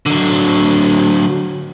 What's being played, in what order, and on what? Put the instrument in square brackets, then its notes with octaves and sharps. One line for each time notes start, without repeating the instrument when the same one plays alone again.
[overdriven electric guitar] D3 F#3